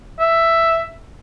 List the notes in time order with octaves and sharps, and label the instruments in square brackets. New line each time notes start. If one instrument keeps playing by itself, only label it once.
[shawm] E5